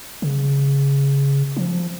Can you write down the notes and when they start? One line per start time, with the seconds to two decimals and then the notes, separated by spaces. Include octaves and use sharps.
0.22 C#3
1.57 F3